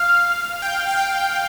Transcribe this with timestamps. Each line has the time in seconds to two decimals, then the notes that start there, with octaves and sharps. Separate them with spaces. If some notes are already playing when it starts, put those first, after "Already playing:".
Already playing: F5 F6
0.62 G5
0.88 G5